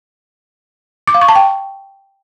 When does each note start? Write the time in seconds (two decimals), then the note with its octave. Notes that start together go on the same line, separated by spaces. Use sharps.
1.07 D6
1.14 F5
1.21 C#6
1.28 A5
1.35 G5